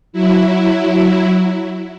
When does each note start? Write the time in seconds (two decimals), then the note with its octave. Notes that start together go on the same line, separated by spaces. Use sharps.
0.13 F#3 E4